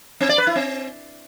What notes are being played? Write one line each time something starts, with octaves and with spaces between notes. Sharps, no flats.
C4
D5
B4
E4
C4